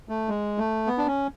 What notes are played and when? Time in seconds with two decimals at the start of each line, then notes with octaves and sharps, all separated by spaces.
0.09 A3
0.29 G#3
0.58 A3
0.87 B3
0.98 D4
1.07 C#4